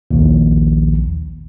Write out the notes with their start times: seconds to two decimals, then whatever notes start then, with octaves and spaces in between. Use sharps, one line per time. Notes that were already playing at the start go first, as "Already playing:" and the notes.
0.11 A#1 D#2